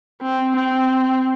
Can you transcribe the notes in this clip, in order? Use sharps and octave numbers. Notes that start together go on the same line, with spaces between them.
C4
C4